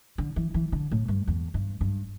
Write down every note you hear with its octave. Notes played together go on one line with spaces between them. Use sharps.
D3
E3
E3
D3
A2
G2
E2
G2
G2